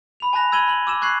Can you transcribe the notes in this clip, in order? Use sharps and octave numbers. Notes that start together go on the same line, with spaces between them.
B5 F7
G#5 A5 B5 F#6 A#6 F7
B5 E6 G#6 D#7 F#7 G7
B5 F#7
D6 E6 E7
C#6 F#6 G#6 C7 F#7